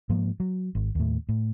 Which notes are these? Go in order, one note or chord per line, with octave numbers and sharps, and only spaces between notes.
G#2 F3 A#3
F#3
G#1
D#2 A2
A2